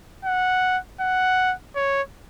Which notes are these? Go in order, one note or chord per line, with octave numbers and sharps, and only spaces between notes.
F#5
F#5
C#5